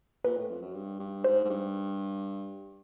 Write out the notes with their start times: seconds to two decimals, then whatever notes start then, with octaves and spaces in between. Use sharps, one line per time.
0.24 A#2 B4
0.36 A2
0.50 F2
0.61 F#2
0.74 G2
0.99 G2
1.24 G#2 C5
1.44 G#2
1.49 G2